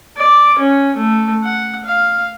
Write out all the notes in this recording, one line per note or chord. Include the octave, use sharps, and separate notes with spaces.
D5
C#4
A3
F#5
F5